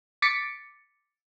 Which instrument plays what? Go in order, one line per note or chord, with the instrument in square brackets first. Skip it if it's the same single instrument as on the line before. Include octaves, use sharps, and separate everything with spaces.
[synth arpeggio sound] D6 A6 B6 C#7 D7